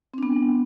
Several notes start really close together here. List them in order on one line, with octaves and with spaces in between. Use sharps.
C4 D4 B3